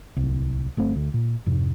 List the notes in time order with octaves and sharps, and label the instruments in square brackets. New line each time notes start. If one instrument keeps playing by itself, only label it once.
[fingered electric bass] D1 C2
G1 A3 C4
D2
A#2
F2 G#2 C3